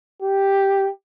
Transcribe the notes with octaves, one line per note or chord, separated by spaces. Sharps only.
G4